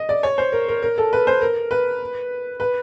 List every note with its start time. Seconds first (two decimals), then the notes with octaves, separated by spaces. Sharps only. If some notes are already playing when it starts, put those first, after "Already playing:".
Already playing: D#5
0.09 D5
0.23 C#5
0.38 C5
0.52 A#4
0.68 A#4
0.82 A#4
0.98 A4
1.13 B4
1.27 C5
1.41 A#4
1.71 B4
2.60 B4